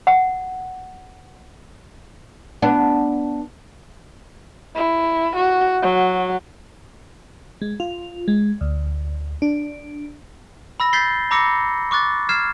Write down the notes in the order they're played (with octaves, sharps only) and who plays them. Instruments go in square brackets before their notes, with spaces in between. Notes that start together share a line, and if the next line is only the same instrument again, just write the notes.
[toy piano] F#5
[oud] B3 D4
[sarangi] E4
F#4
F#3
[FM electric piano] G#3
F4
G#3
D2
D4
[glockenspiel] B5 E6 A#6
B5 G6 A6 B6 C7 G7
A#5 B5 D6 E6 A#6 C#7
C#6 D6 F#6 A6
F6 G#6 C7 E7